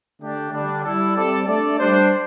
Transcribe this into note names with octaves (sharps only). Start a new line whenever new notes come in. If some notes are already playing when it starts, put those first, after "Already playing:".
D3 A3 D4 G4 D5
D3 G3 D4
G3 E4 A4
G3 C4 A4 D5
A3 D4 A4 D5
G3 D4 C5